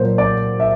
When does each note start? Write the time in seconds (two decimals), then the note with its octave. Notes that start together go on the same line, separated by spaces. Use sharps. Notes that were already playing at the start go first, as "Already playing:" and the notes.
Already playing: A#2 F#3 A#3 C5
0.18 D5
0.60 E5